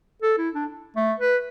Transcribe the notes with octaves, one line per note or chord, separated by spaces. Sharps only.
A4
E4
D4
A3
B4